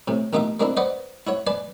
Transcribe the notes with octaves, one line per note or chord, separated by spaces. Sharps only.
A2 C3
A1 B2 A#3 D#4 F4 E5
G#3 A#3 C4 D4 E4
B4 C5 D5 D#5 F#5
E4 F#4 C#5
B4 D5 G#5 A5